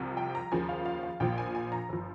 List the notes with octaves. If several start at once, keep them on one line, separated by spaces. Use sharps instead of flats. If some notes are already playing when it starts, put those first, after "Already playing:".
Already playing: C2 C3 F3
G5
A#5
D#2 C#3 F3 G#5
F5
F5
F5
A#1 A#2 F3 G5
G#5
G#5
A#5
G1 F3